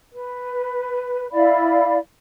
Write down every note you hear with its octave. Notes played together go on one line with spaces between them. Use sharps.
B4
E4 D5 F5 B5